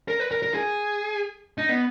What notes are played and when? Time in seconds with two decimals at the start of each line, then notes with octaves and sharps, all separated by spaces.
0.08 A#4
0.20 B4
0.31 A#4
0.42 A#4
0.54 G#4
1.58 D#4
1.69 B3